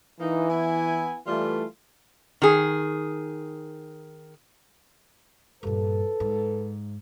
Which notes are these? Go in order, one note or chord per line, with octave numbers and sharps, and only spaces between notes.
E3 A#3 D#4
B3 E4 G#5
E3 G3 A3 F4
D#3 G#4
G2 A#2 A4 B4
G#2